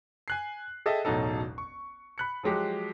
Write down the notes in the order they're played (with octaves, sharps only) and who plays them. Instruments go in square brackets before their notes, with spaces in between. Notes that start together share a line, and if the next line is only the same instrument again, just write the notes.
[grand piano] G#5 F#6 C7
G#4 A4 D#5 E5 G5
E1 A1 B2 F#3 D#4 A4
C#6
B5 F#6 C#7
F3 F#3 G#3 G4